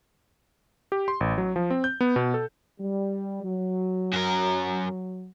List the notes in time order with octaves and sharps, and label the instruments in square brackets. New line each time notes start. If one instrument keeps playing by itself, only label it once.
[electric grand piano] G4
C6
A1
F#3
F3
C4
G6
B3
B2
A4
[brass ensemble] G3
F#3
[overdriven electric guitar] F#2 A#4